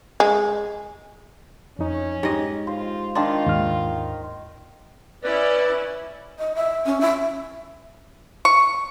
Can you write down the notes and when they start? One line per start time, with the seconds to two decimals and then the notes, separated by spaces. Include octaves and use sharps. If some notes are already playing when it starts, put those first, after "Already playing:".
0.20 G#3
1.79 F2 C#4 D#4
2.23 G#2 G4 D#5
2.67 F4 C5
3.15 D#3 D4 F4 C6
3.46 D#2 G#2 F6
5.24 C#4 E4 B4 D5
6.39 D#5
6.55 E5
6.86 C#4
7.01 E5
8.45 C#6